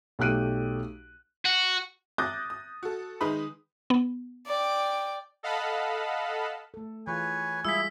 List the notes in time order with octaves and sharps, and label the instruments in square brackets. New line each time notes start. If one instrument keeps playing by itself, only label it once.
[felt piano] B1 A3 G4 F#6 D7 D#7
[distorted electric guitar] F#4
[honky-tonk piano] D6 D#6 F#6 G6 A6 A#6
D#6
F#4 A4
D#3 G#3 D#4 B4 B5 D#6
[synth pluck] B3
[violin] D5 G5
[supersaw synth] A4 D#5 F5 F#5 A5 B5
[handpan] A3 A4
[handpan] E3 F4 G#4 [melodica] B4 C#5 [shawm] G#5
[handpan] G3 G#3 F4 [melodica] E4 G#4 [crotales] E6 B6